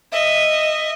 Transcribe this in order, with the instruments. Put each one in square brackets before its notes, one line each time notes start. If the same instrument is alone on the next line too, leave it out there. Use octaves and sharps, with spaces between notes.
[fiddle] D#5 [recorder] E5